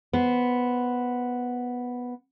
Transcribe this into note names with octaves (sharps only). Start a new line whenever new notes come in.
B3 C5